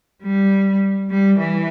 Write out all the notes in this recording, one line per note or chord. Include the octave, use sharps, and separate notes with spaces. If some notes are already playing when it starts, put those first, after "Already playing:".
G3
G3
E3